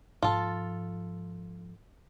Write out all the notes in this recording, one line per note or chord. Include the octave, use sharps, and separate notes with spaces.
G#2 F3 F4 A4